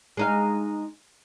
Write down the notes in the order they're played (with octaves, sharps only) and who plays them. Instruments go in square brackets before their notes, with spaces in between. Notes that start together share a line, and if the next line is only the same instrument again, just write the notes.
[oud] G#3 D#4 F5